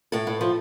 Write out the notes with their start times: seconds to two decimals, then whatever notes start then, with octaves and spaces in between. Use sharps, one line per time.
0.12 A2 A4
0.27 A2
0.41 F3